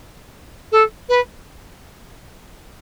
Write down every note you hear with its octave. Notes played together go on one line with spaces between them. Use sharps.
A4
B4